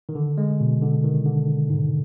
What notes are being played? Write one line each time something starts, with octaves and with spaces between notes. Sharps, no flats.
D#3
D3
G#3
B2
D3
D#3
D3
G#2